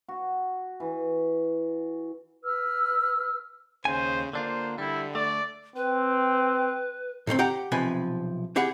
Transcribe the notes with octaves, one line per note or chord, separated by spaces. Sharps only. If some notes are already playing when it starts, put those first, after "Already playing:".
F#4
E3
B4 E6 F6
D#2 C#3 C5 G#5
D3 A#3 D4 F4 C5
D3 G3 E4
A3 D5
C4 B4
A2 D#3 A#3 C4
G4 F#5 G5 A#5
B1 C3 F3 B4 G#5
E4 G4 G#4 F#5